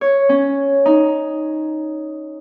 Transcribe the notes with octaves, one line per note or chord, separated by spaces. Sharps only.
C#5
C#4
D#4